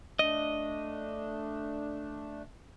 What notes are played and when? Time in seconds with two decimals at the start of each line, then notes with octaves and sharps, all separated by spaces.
0.19 A3 D4 D#5